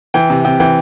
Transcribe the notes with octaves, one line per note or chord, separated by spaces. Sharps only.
E3 G5
C3
C3 G5
E3 G5